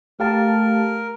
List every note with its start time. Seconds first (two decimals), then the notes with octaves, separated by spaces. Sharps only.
0.20 A3 G4 A#4 F5 A5